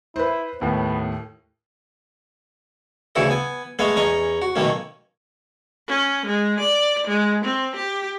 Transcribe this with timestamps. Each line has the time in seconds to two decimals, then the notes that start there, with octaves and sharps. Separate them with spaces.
0.16 E4 B4 C5
0.61 D#2 A2 B3
3.16 D2 C#3 E3 E4 F#4 A4
3.30 B3 G#5
3.79 G#3 A3 B3 C#5 D#5 F5
3.96 E2 C#4 D#5 A#5 C#6
4.42 F#4
4.56 B2 D#3 F#3 A3 A#3 C#4
5.88 C#4
6.26 G#3
6.60 D5
7.07 G#3
7.45 C4
7.76 G4